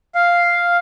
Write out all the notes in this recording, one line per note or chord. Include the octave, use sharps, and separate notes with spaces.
F5